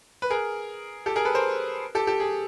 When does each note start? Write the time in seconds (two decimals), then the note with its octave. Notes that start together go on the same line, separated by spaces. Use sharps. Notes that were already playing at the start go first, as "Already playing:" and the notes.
0.22 B4
0.30 G#4 A#4
1.06 G4 A4
1.16 G#4 A#4
1.25 A4 B4
1.35 A#4 C5
1.95 G4 A4
2.07 G4 A4
2.20 G#4